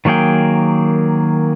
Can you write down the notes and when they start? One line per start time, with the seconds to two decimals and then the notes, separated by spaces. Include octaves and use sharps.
0.05 D#3 F#3 A#3 G#4 G5